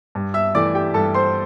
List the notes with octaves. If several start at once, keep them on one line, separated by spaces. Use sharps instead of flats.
G2
E5 E6
E3 A3 D5 D6
G4 G5
G2 A4 A5
C5 C6